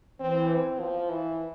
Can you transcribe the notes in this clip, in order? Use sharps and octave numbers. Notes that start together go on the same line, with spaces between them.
E3 C4
C4
F3
E3